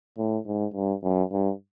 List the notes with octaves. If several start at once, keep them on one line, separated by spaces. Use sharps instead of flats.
A2
G#2
G2
F#2
G2